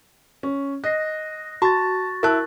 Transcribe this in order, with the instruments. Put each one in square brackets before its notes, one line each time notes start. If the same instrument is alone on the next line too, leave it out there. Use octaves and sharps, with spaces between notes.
[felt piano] C#4
[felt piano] D#5 [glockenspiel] F#6 A#6 C7
[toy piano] F#4 [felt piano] A5 [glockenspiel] C#6 A6
[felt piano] E4 F#6 [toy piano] A#4 A5